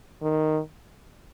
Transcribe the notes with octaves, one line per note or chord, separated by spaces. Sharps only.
D#3